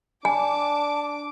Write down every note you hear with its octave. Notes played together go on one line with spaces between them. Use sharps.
D4 G#5 A5 D6